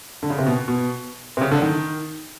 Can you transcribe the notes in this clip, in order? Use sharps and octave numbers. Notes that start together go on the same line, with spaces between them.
D3
C#3
C3
B2
B2
C3
C#3
D3
D#3